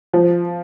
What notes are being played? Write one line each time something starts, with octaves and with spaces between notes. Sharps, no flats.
F3